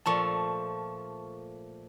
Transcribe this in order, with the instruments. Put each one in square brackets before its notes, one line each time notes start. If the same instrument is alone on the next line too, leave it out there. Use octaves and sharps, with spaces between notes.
[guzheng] A#2 F3 A3 [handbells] A5 C#6